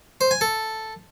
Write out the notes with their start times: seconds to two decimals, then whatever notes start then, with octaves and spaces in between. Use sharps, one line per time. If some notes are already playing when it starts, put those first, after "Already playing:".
0.21 C5
0.31 G#5
0.41 A4